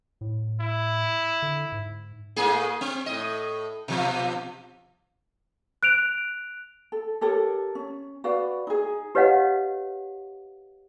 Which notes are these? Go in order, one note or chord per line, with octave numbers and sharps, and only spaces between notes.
A2
E4
D3
G#2
A2 A#3 G#4
C4
A2 D#5
B2 F3
F#6 D7 F7
A4
G4 A4 A#4 C#5
C#4
F#4 B4 D5 F5
D#4 G#4
G4 B4 C#5 D#5 F5 F#5